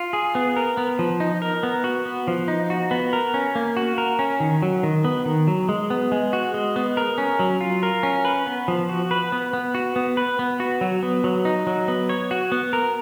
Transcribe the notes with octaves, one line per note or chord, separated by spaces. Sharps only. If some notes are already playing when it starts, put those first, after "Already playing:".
Already playing: F4
G#4
B3
A#4
B3
F3
D#4
A#4
B3
F#4
B3
F3
D#4
F#4
B3
A#4
C#4
A#3
F#4
A#4
C#4
D#3
F#3
D#3
B3
D#3
F#3
G#3
B3
G#3
F#4
G#3
B3
A#4
C#4
F#3
F4
A#4
C#4
B4
B3
F3
F#4
B4
B3
B3
F#4
B3
B4
B3
F#4
F#3
B3
F#3
D#4
F#3
B3
C#5
F#4
B3
A#4